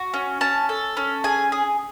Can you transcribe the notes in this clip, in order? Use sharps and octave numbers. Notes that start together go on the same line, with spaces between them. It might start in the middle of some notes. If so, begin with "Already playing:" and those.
Already playing: F#4
C#4
C#4 A5
A4
C#4
G#4 G#5
G#4